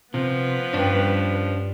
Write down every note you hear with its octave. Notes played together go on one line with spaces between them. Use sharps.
C3 F3 B3 B4
G2 C#4 D4